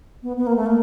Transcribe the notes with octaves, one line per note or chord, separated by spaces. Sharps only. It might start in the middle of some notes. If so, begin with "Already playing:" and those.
B3
B3
A#3
A3
A#3